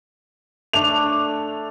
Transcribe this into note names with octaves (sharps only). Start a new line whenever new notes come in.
A3 D4 F7